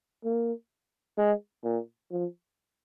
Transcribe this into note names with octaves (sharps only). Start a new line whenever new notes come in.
A#3
G#3
A#2
F3